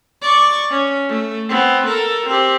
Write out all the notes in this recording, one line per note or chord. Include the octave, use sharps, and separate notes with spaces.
D5 C#6
C#4
A3
B3 C4
A4 A#4
C4 G4